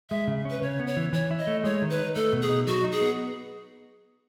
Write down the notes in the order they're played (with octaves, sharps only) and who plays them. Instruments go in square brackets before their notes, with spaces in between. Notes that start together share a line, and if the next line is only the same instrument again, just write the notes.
[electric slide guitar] G#3 [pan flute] E5
[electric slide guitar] C#3
C#4
[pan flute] B4
[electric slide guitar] C#3 [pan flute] C#5
[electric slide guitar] B3
[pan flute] C#5
[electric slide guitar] E3
[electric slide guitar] E3 [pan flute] C#5
[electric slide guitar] E4
[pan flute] D#5
[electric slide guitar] A3
[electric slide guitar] G#3 [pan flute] C#5
[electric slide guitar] D#3
[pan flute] B4
[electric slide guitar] D#4
[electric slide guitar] A3 [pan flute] A4
[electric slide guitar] B2
[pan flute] G#4
[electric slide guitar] D#4
[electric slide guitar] F#3 [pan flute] F#4
[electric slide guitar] D#4
[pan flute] G#4
[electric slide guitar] B3